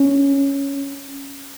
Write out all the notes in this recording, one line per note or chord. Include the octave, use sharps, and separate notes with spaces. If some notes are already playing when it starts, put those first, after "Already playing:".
Already playing: C#4